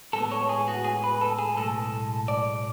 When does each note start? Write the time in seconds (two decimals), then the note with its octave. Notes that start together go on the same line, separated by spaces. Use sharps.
0.13 A2 G#3 B3 A4
0.32 C#5
0.49 G#4
0.68 F#4
0.85 G#4
1.04 B4
1.21 A4
1.39 G#4
1.57 B1 A2 G#3 A4
2.28 D5